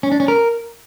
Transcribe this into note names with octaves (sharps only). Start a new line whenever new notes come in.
C#4
D4
C#4
A#4